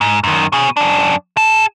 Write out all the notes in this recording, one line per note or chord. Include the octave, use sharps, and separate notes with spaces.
G#2
F#2 D#3
B2 G#4
F#2 D4
G#4 A5